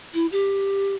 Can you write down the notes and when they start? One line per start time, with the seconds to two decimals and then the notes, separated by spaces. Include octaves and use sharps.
0.14 E4
0.32 G4